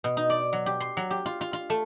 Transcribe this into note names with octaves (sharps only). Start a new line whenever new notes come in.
B2
D#4
D5
F#3
G4
C6
F#3
G4
F4
F4
F4
A3